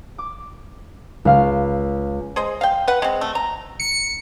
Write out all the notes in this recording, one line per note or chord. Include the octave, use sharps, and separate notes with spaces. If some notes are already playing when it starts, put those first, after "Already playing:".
D6
C#2 F5 F6
G#4 C5 D#5
F5 G5
B4 F#5
G#3 C4
A3
A#5
C#7